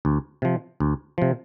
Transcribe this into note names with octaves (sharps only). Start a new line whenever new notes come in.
D2
C3 F3
D2
C3 F3